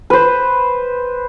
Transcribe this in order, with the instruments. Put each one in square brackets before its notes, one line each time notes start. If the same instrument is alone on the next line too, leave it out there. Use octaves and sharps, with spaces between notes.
[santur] B4 C5